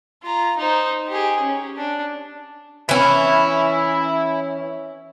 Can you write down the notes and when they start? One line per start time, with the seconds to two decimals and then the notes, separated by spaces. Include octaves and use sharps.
0.23 F4 A#5
0.57 D#4 C5
1.08 G4 G#4
1.40 C#4
1.76 D4
2.89 E3 C#4 E5 B5